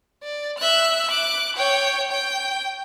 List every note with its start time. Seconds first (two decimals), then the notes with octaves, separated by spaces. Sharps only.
0.23 D5
0.58 E5 F#6
1.08 D6 F#6
1.56 C#5 G5
2.11 G5